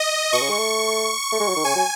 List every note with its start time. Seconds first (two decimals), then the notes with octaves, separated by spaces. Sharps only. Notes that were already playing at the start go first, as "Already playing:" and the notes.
Already playing: D#5
0.33 B2 C#6
0.41 C#3
0.50 G#3
0.58 A3
1.32 A3
1.40 G#3
1.48 F#3
1.56 D#3
1.65 C#3 G#5
1.76 F#3